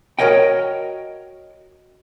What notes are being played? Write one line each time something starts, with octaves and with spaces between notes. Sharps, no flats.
F#4 A#4 C#5 D#5 G5